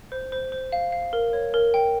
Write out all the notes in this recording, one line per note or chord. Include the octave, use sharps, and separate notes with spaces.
C5
C5
C5
F5
F5
A#4
C#5
A#4
G5